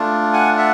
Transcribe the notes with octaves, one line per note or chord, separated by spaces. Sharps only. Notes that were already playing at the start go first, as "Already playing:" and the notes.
Already playing: A3 D4 F4
F#5 G#5
E5 F#5